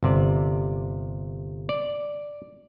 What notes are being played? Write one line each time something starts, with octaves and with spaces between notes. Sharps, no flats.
G1 C3 D5
D5